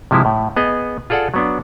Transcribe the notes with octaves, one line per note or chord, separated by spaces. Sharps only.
C3 F3 G#3 E4
A2
B3 G#4 D#5
F4 G#4 A4 D5 F#5
F#3 B3 D4